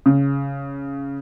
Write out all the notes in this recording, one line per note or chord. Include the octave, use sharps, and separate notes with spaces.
C#3